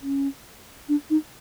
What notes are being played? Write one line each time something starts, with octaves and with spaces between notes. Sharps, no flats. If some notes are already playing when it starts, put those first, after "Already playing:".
C#4
D4
D#4